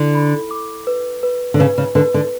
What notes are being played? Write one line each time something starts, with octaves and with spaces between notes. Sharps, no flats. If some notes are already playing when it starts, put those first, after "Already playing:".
Already playing: D3 E4
B5
D6
B4
B4
D3
C#3 B4
C#3
D3 B4
D3